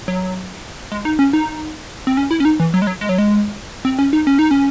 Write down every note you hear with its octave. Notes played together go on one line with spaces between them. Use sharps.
F#3
G#3
D#4
C#4
D#4
C4
C#4
E4
C#4
D#4
E3
F#3
G#3
F#3
G#3
F#3
G#3
C4
C#4
D#4
C#4
D#4
C#4